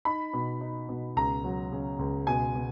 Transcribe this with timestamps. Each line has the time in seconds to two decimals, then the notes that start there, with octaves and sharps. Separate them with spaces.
0.05 D#4 B5
0.33 B2
0.61 D#4
0.89 B2
1.16 C#2 A#5
1.44 F#3
1.72 C#3
1.99 C#2
2.27 B2 G#5
2.55 B2